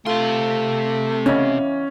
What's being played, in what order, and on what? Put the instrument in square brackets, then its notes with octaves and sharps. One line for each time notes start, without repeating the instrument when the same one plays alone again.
[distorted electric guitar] C3 C6 [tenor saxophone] A3 [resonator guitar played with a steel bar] F4
[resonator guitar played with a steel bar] E2 C#3 D#5 [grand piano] C#4